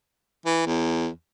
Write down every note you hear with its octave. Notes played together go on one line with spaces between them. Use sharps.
E3
E2